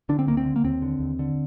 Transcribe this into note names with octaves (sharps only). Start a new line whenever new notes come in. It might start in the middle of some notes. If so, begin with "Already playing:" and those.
D3 D4
C4
D2 A#3
C4
D3
A#3
D#2 C4
D3
D#2
D3